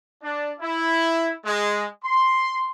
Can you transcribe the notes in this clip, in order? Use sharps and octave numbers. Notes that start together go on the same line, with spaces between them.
D4
E4
G#3
C6